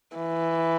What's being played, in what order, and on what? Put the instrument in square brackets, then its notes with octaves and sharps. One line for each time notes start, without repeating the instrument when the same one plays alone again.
[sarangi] E3